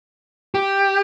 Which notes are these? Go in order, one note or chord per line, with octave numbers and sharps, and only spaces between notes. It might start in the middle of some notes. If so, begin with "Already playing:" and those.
G4